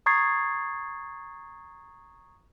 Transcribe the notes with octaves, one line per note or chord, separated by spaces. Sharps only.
A#5 C#6 D#6 G#6 A6 C7